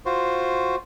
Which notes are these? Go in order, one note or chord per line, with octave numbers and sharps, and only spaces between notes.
F4 F#4 C5